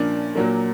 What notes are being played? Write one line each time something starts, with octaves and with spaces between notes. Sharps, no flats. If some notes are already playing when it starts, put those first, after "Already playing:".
Already playing: A#2 F3 A#3 C#4 D4
A#2 F#3 A#3